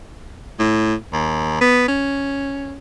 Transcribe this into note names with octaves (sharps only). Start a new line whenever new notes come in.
A2
D#2
B3
C#4